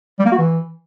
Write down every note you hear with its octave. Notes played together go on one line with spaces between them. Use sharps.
G3
A#3
F#4
E3